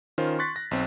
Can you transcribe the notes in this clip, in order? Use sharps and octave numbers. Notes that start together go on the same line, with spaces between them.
D#3 C#4 F4 C5
C6 C#6 F#6 A6 B6
A#6
B1 C4